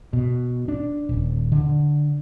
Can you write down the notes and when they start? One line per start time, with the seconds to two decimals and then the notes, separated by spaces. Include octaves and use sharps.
0.13 B2
0.68 D4
1.09 D#1
1.52 D3